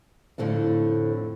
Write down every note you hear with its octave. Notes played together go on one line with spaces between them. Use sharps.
F2 A2 D3 C4 D4